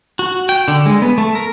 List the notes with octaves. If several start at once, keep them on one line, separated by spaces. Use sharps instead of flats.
F#4
G5
D3
G#3
B3
A3
A#4